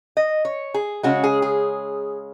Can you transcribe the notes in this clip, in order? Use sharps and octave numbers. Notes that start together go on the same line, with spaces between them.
D#5
C#5
G#4
C#3 G#3 C#4 F#4
G#4
G#4